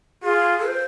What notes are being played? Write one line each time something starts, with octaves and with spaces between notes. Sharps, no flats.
F4 G#4
C5